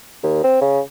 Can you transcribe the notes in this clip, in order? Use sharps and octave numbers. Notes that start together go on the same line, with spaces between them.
D#2
C4
C#3